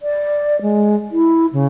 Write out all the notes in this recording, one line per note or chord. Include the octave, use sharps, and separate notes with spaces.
D5
G#3
E4
C#3